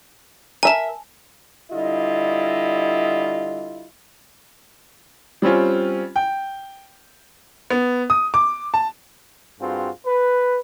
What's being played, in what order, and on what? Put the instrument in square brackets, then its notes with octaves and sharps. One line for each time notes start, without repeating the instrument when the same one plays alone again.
[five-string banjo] A#4 E5 [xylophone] G#5 A5
[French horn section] D3 G3 E4 F4 D#5
[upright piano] G3 C4 C#4 F4
G5
B3
D#6
D6
A5
[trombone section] G2 C4 F4 F#4 G#4
B4